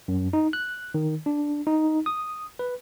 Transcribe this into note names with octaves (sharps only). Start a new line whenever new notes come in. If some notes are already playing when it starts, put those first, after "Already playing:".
F#2
D#4
F#6
D#3
D4
D#4
D#6
B4